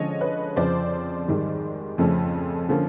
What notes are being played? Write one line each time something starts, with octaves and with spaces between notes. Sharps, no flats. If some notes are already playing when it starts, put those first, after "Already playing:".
Already playing: D3 F3 G#3 C#4 C#5 D#5
B4 C#5
F2 C#3 F3 C5 D5
G#2 D#3 G3
F2 C#3 F3 A3 C#4
D3 F3 A#3 C#4